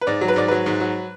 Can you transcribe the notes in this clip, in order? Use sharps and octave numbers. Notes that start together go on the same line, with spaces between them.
B4
G#2 D5
F#3
B4
G#2 D5
F#3 B4
G#2
F#3